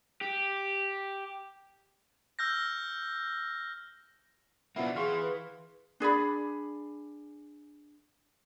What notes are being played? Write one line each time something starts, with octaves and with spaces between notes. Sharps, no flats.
G4
E6 F6 G6 A#6
B2 F3 A#3 D4 E4 F#5
E3 G#4 F5 C6 C#6
B4
D4 G#4 D5 B5